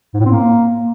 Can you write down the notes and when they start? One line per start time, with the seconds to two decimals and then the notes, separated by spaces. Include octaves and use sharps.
0.14 G#2
0.20 A2
0.26 C4
0.31 A#3